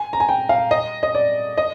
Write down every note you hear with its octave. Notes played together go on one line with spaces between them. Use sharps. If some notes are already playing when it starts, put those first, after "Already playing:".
Already playing: G#5
A#5
G#5
G5
F5
D#5
D#5
D5
D#5